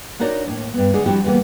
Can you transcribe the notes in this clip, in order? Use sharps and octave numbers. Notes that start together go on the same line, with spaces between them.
D4 D#4 F#4 A#4 C#5 D5
D#2 A2
G2 B3
D3 G#3 D4 D#4 G#4
F3 G3 C4 E4 F#4 G4
E2 D3 G3 G#3 A#3 B3